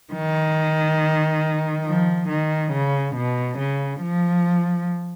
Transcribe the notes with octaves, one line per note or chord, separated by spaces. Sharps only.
D#3
F3
D#3
C#3
B2
C#3
F3